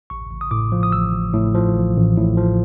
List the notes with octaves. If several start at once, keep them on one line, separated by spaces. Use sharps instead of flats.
A1 C#6
A1
D#6
A2 D6
F3
D#6
A1 E6
A1
A2
F3
A1
A1
A2
F3